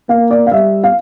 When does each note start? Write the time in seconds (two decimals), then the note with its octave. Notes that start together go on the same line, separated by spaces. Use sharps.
0.09 A#3 F5
0.31 D5
0.47 F5
0.52 G3 E5
0.84 F5